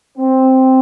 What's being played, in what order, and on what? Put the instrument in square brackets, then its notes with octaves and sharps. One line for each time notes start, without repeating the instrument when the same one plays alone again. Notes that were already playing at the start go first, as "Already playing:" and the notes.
[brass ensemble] C4